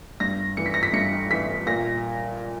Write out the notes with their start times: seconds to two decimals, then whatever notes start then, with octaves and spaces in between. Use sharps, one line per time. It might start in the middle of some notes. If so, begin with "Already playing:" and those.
0.20 G2 A#6
0.57 E3 C#7
0.66 B6
0.74 A#6
0.83 B6
0.93 G2 C#7
1.30 E3 B6
1.66 A#2 A#6